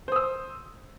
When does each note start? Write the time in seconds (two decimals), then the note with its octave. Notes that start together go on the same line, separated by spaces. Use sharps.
0.08 C5
0.12 D#6
0.16 E6